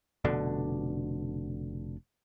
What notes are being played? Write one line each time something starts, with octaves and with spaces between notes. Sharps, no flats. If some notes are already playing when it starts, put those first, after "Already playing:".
F1 B2 D3 D4